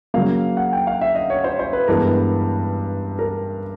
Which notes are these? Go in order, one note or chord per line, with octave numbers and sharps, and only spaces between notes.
C#3 F#3 A#3 F5
F#5
G5
F5
E5
D#5
C#5
C5
C5
B4
G2 E3 G#3 B3 A#4
A#4